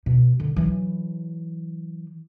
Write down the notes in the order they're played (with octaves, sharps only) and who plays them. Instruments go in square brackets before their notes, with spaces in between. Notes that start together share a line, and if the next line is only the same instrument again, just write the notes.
[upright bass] B2
D3
E3 F#3